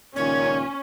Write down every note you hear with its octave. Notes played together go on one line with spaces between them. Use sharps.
C#2 A#2 D#3 C#4 C#5